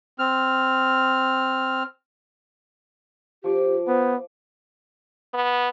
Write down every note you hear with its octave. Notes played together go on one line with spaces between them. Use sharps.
C4 F6
F3 G4 D5
B3 C5
B3